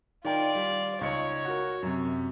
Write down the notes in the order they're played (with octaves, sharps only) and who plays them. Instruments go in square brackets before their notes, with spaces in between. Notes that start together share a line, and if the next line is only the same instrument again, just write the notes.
[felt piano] D#3 G5 [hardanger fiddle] F4 D5
[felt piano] G3
[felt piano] C#2 D#4 C#7 [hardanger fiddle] C#5
[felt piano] F#4 A#4
F#2 C3